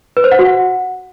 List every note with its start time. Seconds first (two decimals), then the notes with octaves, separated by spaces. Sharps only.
0.17 B4
0.24 C5
0.31 F#5
0.39 F#4
0.46 F#5